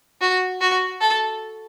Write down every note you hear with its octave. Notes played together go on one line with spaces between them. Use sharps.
F#4
F#4
A4